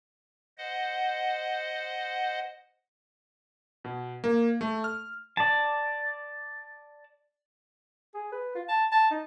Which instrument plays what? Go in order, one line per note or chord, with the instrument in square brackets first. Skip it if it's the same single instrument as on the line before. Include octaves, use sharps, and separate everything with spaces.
[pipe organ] C5 D#5 F#5
[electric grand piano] B2
A#3
A3
F6
[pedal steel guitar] D5 A5
[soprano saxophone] G#4
B4
F4
A5
A5
D#4